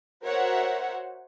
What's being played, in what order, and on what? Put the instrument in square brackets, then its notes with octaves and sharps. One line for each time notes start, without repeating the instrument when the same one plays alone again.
[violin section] F#4 A#4 C5 C#5 E5 F#5